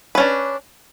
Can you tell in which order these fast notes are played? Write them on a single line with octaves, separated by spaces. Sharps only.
B4 C#4 D4